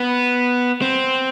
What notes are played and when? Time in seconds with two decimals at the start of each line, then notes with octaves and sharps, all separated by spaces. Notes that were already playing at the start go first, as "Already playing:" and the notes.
Already playing: B3
0.82 C4